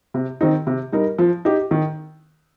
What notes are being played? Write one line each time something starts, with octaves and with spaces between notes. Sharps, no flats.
C3
D#3 C4 D#4
C3
G3 D#4 A#4
F3
D#4 G4
D#3